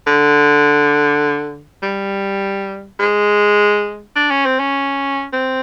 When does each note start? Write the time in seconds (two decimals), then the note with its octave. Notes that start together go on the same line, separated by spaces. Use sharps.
0.07 D3
1.83 G3
3.00 G#3
4.16 D4
4.31 C#4
4.46 C4
4.60 C#4
5.33 C4